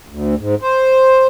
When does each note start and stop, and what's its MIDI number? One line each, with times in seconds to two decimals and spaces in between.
0.08 0.35 38
0.39 0.55 44
0.62 1.27 72